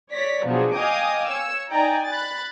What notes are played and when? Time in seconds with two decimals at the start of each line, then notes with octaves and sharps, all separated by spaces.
0.12 C#5 D5 A#6 B6
0.45 B2 F3 F#3 D4 G#4
0.77 D#5 F5 G5 G#5 D6 D#6
1.27 C#5 E6
1.71 D#4 D5 G5 G#5 A#5
2.08 B5 F#6 A6